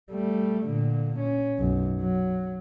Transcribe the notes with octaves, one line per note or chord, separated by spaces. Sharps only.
G3 A3
A#2 D3
C#4
B1 F#2
F#3